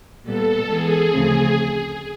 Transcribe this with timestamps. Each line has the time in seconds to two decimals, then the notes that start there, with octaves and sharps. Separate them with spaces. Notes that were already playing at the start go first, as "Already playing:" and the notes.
0.24 A#2 G3 B3 A4
0.67 E3 G#3 B3 G#4
1.09 D2 C#3 F3 A3 C4